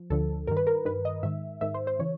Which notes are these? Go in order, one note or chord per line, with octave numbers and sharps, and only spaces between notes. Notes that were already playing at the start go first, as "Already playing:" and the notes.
Already playing: F3
D2 D3 F3 A4
G2 D#3 A#4
B4
A#4
G2 D#3 B4
D#5
G#2 D#3 E5
G#2 D#3 E5
C5
C5
C#3 E3 C#5